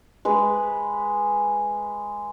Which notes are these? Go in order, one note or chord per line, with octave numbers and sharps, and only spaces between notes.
G#3 B4